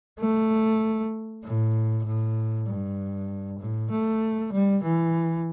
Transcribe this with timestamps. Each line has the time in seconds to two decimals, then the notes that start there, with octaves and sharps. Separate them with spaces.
0.19 A3
1.44 A2
2.05 A2
2.67 G2
3.59 A2
3.91 A3
4.52 G3
4.83 E3